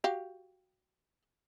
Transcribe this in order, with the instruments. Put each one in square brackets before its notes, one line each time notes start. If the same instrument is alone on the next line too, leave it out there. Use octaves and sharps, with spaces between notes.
[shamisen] F#4 G4 F5